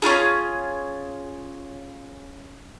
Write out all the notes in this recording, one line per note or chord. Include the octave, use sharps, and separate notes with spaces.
C#4 E4 F4 G#4